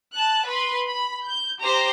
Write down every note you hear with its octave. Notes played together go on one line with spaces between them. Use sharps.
A5 F#6
B4 B5 C6
B5
G6
G4 C5 A#5